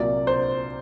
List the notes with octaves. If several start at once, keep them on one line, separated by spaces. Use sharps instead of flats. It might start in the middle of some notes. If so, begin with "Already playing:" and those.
Already playing: C2 A#2 F#3 A#3 D5
C5